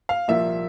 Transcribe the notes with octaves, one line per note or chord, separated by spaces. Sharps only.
F5
C2 A#2 F3 A#3 E5